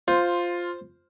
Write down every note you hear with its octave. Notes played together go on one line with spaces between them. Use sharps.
F4 C5